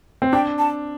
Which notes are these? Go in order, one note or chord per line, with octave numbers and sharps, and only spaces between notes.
C4
D4 G5
A5